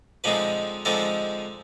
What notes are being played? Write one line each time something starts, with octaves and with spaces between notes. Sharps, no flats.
D3 F3 G#3 C4 D#4 B4
D3 F3 G#3 C4 D#4 A4